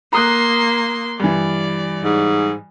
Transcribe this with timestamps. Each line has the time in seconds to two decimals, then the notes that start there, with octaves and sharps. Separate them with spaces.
0.13 A#3 A#5 C6 D#6 F#6
1.20 G2 E3 D5
2.04 G#2